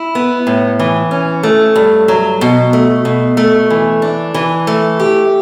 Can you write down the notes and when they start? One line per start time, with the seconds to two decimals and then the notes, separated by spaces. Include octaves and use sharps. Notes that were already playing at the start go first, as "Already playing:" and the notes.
Already playing: E4
0.15 B3
0.47 A2
0.80 E3
1.11 C#4
1.43 A3
1.76 G2
2.08 F#3
2.41 B2
2.73 A3
3.05 B2
3.37 A3
3.70 E3
4.02 D4
4.34 E3
4.67 A3
5.00 G4